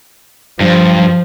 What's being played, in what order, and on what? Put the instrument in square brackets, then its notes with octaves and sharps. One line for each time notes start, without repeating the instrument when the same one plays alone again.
[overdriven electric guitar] G2 [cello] F3